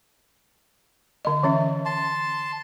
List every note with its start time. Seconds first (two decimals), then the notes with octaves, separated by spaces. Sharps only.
1.25 D3 D#5
1.43 E3 C#4 E5
1.86 A5 C6